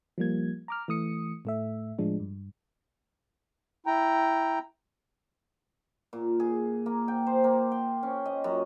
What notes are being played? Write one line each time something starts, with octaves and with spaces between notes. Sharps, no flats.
F3 G3 A#3 G#6
A#5 D6 F6
E3 A3 D#6 C#7
A2 A3 E5
A2 F3 G#3 D4
G2
E4 G5 A#5
A#2
G#4
A#3
G5
C5
A#3
G5
C#4
D#5
F#2